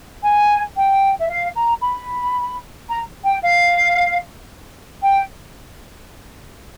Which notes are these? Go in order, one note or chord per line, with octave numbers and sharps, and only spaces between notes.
G#5
G5
E5
F5
A#5
B5
A#5
G5
F5
G5